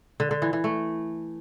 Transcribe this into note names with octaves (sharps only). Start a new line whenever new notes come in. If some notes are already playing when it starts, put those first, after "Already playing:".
D3
D3
E3
E3
A3